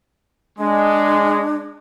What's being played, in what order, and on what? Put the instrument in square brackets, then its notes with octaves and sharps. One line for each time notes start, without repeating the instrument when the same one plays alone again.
[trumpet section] G#3 [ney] D4